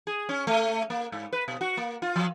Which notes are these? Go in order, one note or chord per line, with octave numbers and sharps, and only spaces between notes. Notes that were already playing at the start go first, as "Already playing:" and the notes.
G#4
C#4
A3
A#3
G#2
B4
B2
F#4
A#3
F4
F3